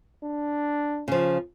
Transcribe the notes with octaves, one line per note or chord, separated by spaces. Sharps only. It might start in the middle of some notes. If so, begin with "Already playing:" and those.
D4
C#3 F3